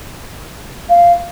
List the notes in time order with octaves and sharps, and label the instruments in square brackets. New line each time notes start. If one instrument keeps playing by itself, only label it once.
[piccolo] F5